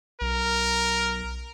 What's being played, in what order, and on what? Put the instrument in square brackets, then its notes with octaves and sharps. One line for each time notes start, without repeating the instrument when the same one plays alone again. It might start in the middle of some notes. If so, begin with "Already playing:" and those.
[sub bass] B1 [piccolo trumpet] A#4